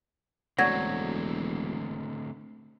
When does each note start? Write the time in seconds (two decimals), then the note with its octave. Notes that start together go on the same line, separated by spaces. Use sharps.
0.58 E1 D3 F#3 A3 C4 D5 G#6 A#6